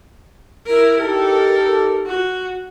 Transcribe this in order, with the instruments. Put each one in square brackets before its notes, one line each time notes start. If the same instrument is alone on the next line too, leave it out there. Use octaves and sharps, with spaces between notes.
[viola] E4 A#4
[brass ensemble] D#4 G4 A4 [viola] A#4
[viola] F#4